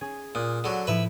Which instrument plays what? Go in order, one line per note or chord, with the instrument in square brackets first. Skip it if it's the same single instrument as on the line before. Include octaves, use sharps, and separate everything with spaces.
[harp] C#4 G#4 G#5
[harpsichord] A#2 [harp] D#6 F#6
[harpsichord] D3 F#3
[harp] A2 F3 E4 [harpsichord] B4 E5